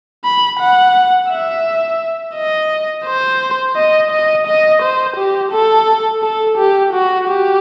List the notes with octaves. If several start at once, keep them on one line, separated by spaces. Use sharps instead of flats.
B5
F#5
E5
D#5
C5
D#5
D#5
D#5
C5
G4
A4
A4
G4
F#4
G4